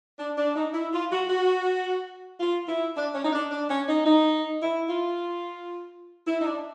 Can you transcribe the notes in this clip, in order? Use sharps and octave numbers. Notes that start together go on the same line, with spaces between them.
D4
D4
D#4
E4
F4
F#4
F#4
F4
E4
D4
C#4
D#4
D4
D4
C#4
D#4
D#4
E4
F4
E4
D#4
D4